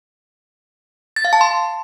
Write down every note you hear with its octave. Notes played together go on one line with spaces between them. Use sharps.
A6
F5
A5
C6